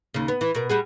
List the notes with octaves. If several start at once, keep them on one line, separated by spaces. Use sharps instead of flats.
D#2 C#3
B3
E3
B2 A#4
G3 F#4 G#4